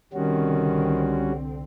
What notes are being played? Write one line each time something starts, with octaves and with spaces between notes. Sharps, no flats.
C2 D3 D#3 G3 C4 C#4 F#4